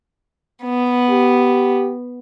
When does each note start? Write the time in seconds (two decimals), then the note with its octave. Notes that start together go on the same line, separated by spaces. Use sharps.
0.64 B3
1.09 G4